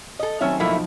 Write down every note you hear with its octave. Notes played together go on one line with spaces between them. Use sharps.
A4 D#5
D#3 F#3 A3 C4 C#4 E5
B1 F3 A3 A#3 D#4 E4